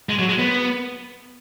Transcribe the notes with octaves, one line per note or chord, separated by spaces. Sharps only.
G#3
F#3
G#3
B3